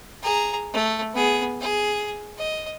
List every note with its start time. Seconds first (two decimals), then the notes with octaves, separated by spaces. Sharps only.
0.23 G#4 A#5
0.73 A3
1.14 B3 G#4
1.61 G#4
2.38 D#5